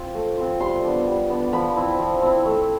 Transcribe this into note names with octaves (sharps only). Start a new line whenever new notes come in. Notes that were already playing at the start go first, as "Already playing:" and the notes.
Already playing: C4 F4
A3
C4 F4
G3 C6
B3 D4
G3
B3 D4
F3 B5
C4 E4
F3
C4 E4
A3